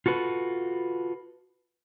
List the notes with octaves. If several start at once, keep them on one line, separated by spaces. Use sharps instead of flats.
F4 F#4 A4 B4